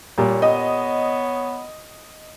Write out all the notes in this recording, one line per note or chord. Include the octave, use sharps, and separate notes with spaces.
A#2 G3 C#5
B3 D#5